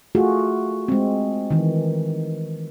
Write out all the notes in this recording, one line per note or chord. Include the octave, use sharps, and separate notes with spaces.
A3 F4 F#4 G#4
G#3 C4
D#3 E3